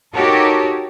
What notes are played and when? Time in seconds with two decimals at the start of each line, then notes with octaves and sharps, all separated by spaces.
0.15 D#4 F#4 G4 A4 A#4 C#5